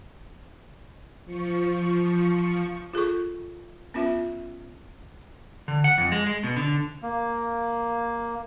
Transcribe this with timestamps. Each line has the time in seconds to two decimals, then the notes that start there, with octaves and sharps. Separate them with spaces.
1.25 F3 C#6
2.93 F4 G#4 A4 C#6
3.94 B3 C#4 F4 E5
5.68 D3
5.84 F#5
5.98 F2
6.12 G#3
6.27 G#3
6.44 B2
6.57 D3
7.03 A#3